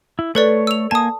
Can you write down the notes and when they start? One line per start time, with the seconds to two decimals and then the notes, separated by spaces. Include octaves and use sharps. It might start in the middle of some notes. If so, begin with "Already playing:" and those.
0.19 E4
0.35 A3 A4 B4 C#5 D5
0.67 E6 F7
0.91 A#3 G#5 A5 D#6